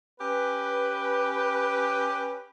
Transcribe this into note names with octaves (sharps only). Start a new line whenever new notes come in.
C#4 G4 B4